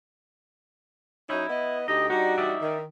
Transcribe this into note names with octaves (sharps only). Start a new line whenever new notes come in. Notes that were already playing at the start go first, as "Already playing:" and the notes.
F#3 C#4 D#4 E4
B3 B4 D#5
D2 D#4 G4 D#5
G3 D4 D#4 F#4
D#4 D5 E5
D#3